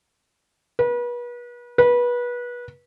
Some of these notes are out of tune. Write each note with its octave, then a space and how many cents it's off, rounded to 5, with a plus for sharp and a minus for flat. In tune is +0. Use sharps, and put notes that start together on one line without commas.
B4 -35
B4 -25